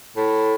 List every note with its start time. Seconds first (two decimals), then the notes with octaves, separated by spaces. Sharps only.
0.17 A2